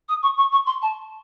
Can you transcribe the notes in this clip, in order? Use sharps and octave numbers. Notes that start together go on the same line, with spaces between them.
D#6
C#6
C#6
C#6
C6
A5